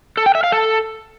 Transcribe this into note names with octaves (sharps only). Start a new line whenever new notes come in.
A4
G5
E5
F5
A4